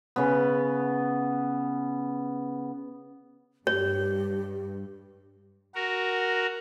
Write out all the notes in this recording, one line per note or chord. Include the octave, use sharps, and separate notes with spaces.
C#3 B3
G2 G4 C#5
F#4 A#4